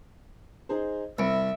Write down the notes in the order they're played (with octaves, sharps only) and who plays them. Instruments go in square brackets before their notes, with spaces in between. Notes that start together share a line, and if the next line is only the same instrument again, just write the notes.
[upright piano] D#4 G#4 C5
[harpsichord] C2 [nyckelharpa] E5 [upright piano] B5 C#7 D7